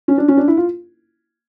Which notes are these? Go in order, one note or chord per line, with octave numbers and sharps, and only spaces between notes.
C#4
D4
C#4
D4
E4
F4